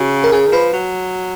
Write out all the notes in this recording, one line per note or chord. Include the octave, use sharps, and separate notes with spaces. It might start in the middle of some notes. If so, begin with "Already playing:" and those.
Already playing: C#3 F#4
A#4
C#3 G#4
D#3
F3 B4
F#3